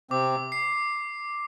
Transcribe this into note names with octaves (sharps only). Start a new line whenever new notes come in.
C3 C4 D6
C7